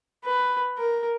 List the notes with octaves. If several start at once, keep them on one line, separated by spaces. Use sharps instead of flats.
B4
A#4